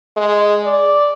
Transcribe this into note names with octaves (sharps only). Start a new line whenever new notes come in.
G#3
D5